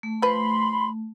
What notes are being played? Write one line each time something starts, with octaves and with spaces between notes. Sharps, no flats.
A3
F3 B4 B5 C6